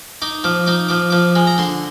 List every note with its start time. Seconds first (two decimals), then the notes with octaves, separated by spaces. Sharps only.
0.22 D#4 D6
0.44 F3 D6
0.66 D#4 D6
0.88 F3 D6
1.10 F3 D6
1.35 G#3
1.47 A#5
1.58 D3 C6